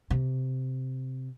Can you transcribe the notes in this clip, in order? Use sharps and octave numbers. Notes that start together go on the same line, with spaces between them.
C3